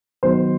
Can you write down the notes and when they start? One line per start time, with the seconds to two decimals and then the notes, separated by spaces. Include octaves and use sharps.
0.23 D#3 F#3 B3 C5